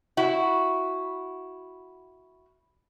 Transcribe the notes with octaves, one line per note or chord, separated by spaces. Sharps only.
E4 F#4